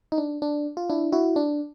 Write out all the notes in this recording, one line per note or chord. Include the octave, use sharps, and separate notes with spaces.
D#4
D4
D4
F4
D4 E4
E4 F#4
D4